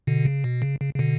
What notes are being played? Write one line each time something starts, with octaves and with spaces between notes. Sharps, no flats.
B2 D3
C#3
B2
C#3
C#3
C#3
B2 D3